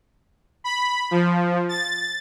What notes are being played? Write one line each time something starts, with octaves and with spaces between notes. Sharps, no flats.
B5
F3
A6